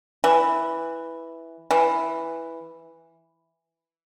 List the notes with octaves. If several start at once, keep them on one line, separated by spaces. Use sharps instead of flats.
E3
E3